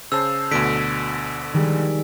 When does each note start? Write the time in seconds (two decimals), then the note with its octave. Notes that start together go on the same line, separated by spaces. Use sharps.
0.12 C#3 C5 A5 E6
0.51 D2 B2 D3 B6 D7
1.54 D#3 G3 G#3